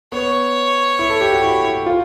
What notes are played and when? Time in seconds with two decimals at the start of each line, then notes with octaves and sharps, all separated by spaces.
0.12 B3 C#5
0.99 E4
1.10 A4
1.21 G4
1.32 F#4
1.43 E4
1.65 E4
1.86 F4